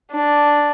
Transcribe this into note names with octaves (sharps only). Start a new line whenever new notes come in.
D4